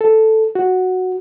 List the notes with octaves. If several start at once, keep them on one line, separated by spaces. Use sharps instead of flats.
A4
F#4